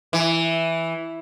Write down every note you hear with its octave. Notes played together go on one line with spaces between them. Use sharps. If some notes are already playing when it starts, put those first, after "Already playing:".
E3